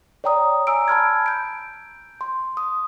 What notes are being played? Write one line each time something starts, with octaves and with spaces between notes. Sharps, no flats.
C#5 D5 G5 A#5 D#6
G#5 A#5 E6 D7
A5 B5 F6 G#6
G6 D7
C6
D#6